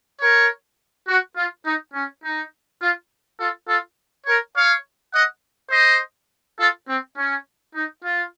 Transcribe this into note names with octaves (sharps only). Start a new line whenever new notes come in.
A#4 C#5
F#4
F4
D#4
C#4
D#4
F4
F4 A4
F4 A4
A#4 C#5
C#5 F5
D#5 F#5
C5 D#5
F4 A4
C4
C#4
D#4
F4